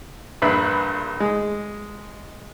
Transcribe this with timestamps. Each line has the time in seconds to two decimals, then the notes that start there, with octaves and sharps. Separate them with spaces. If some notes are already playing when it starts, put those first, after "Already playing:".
0.42 A#1 G2 B4 E5
1.20 G#3